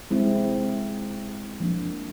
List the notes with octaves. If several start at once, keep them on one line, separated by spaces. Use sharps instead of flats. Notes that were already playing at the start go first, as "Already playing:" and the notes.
G#3 C4 E4
F3 A#3 D4